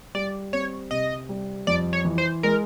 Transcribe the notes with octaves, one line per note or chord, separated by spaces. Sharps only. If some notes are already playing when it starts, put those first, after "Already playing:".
G3 D5
C4 C#5
C3 D#5
G3
F2 D5
C#5
E3
C5
G#3 A#4